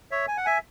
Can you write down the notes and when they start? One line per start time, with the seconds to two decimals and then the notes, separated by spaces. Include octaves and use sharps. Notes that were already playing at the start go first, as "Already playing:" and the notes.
0.11 C#5 E5
0.28 G#5
0.37 F#5
0.45 E5 G#5